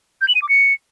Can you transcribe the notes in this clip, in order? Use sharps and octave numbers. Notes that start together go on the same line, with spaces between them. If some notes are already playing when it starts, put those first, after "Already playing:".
G6
F#7
D#7
D6
C#7